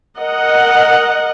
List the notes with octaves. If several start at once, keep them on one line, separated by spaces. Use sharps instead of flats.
A#4 D#5 F#5